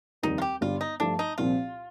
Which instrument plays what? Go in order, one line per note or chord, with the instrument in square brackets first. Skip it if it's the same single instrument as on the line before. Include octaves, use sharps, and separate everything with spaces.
[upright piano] F1 D#2 D#3 G3 [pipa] D#4
[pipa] F4
G4
[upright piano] G1 G2 D3 G3 [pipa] F4
[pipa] D#4
[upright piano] G2 F3 A3 [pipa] D4
[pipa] D#4
[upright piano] C2 A#2 F3 C4 [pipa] F4